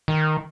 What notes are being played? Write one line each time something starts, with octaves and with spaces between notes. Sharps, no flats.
D#3